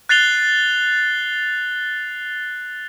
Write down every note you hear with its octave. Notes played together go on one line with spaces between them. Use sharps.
F#6 A6 C7 F7 G7